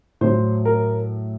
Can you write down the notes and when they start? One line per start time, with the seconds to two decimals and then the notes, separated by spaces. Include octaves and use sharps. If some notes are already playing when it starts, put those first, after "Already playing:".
0.21 A2 F#3 C5
0.65 A#4